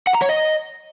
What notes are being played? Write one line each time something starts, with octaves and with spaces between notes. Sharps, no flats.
F#5
A#5
C#5
D#5